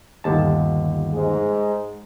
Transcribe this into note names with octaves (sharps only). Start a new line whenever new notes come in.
G1 D#2 A5
G#2 G#3